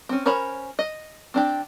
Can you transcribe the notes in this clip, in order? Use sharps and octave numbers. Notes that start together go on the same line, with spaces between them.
C4 C#4
C#4 A#4 C5 C#5 B5
D#5
C4 D4 G4